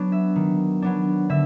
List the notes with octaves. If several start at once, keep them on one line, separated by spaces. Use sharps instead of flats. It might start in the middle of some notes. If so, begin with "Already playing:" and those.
Already playing: F#3 B3 D4
E5
D#3
F#3 B3 D4
D3 E5